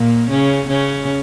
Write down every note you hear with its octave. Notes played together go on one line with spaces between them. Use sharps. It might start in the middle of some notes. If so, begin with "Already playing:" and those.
Already playing: A#2 A#3
C#3 C#4
C#3 C#4